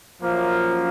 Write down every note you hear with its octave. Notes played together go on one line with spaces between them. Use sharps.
F#2 F3 A#3